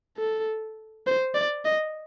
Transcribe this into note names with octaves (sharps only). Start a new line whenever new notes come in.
A4
C5
D5
D#5